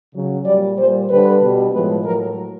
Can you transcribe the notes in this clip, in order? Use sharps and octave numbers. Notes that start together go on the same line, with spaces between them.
C#3 F#3
A#2 G3 D5
A#2 G3 C5
D3 G3 B4
B2 G3
A2 F3 G#3 B4
A2 F#3 A#4